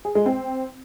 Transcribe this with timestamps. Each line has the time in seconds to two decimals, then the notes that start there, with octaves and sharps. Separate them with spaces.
0.05 G#4
0.15 G#3
0.26 C4